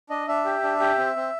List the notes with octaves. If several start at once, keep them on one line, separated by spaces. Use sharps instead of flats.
D4 D#5
D4 E5
G4
D4
G4
C4
C4